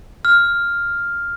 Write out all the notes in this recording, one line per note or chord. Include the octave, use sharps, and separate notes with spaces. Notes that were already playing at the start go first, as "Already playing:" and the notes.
F6